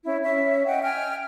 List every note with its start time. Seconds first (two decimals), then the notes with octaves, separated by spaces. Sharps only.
0.04 C#4 E4
0.23 C#4 E5
0.66 D#5 F#5 G5
0.83 G5 G#5 F6